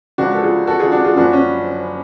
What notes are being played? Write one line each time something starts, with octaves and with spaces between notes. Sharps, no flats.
C#2 C#3 F3 D4 F#4
A4
F4 G#4
F#4 A4
F4 G#4
D4 F#4
F4 G#4
F#1 F#2 C#3 F3 D4 F#4
C#4